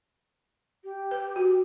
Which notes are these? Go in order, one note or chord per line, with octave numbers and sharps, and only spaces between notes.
G4
B4
F#4